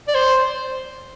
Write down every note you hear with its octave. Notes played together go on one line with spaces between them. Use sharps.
D5
C5